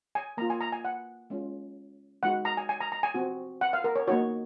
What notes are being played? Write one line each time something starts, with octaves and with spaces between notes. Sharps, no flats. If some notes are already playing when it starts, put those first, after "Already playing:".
G#5
A#3 F4 A#5
G#5
A#5
G#5
F#5
G#3 C#4 F4
G#3 D#4 F#4 F#5
A#5
G#5
G#5
A#5
A#5
G#5
C4 F#4
F#5
F5
A#4
C#5
A#3 D#4 F#4 C#5